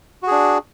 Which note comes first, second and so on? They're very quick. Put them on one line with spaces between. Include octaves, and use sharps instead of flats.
F#4 G#4 D4